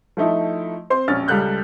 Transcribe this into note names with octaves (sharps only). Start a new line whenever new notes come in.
F3 A3 D#4 E4
C4 C5 C6
E1 A#1 C#4 F6 A6
C#2 G3 A4 F#6 G6